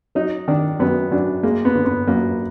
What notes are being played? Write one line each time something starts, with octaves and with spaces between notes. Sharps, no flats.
F#3 D#4
D#3 D4
F#2 B3
F#2 D4
G#3 A#3
B3
D3
B3
F#2 A#3